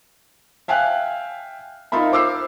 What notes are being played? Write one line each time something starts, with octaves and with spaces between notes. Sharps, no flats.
E5 F5 G5 G#5 F#6
D#4 F4 A#4 E5 B5
C5 D6 E6 C7